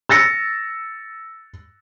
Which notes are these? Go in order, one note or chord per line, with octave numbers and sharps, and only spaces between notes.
E6 A6 A#6 C#7